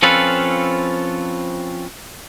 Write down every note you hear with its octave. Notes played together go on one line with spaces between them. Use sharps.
F3 C4 C#4 F4 A4 B4